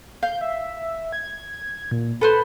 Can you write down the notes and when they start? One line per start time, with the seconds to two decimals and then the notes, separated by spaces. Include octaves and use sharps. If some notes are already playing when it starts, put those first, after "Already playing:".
0.23 F5 G6
0.41 E5
1.13 G#6
1.91 A#2
2.21 A4 B4 C5 B5